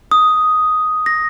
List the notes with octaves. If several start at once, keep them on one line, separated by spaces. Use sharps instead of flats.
D#6
A#6